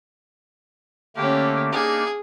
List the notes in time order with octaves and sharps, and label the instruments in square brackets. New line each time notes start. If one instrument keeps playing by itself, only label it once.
[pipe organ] D3 A3 A#3 [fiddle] C#4 G4
[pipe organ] A#3 D4 D#4 [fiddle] G#4